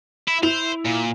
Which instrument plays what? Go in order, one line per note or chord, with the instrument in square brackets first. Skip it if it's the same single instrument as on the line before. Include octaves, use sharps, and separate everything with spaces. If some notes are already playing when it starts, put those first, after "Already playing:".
[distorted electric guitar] E4
[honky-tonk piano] E4 F7 [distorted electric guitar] C5
[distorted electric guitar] A#2